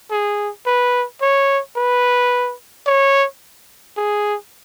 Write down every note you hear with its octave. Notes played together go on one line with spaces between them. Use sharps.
G#4
B4
C#5
B4
C#5
G#4